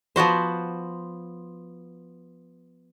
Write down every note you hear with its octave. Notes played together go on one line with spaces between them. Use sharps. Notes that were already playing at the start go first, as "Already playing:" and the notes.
F3 B3 F#4 C5